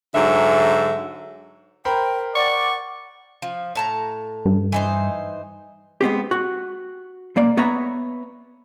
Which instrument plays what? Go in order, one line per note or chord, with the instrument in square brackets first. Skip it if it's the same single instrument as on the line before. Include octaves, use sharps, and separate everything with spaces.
[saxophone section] G#2 D3 F#3 E5
[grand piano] A#4 C5 B5 [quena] G5
[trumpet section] D5 [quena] F#5 [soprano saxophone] C#6
[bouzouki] F3
A2 A5 A#5
[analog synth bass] G2
[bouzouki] E3 D#4 C5
[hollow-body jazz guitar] G#3 B3 C4 G4
F#4
B1 A#3 D5
B3 B4 C#5 E5 A#5